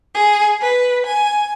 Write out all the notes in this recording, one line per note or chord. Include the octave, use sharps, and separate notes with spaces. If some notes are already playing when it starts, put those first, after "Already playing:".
G#4
B4
G#5